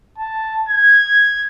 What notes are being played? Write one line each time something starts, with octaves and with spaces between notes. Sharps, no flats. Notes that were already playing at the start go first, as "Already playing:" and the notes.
A5
G#6